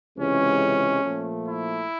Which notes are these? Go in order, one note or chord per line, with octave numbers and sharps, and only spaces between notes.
C#2 C3 E3 G#3 C#4
A#2 F3 A3
E4